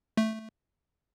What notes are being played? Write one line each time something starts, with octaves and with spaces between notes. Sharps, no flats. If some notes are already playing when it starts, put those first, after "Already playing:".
A3